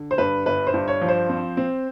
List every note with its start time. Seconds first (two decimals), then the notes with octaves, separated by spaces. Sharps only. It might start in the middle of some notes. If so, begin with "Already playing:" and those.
Already playing: D3
0.11 C5
0.18 G2 B4
0.46 G1 B4
0.67 C5
0.74 G2
0.88 C#5
1.02 F3
1.09 C5
1.29 C4
1.57 C4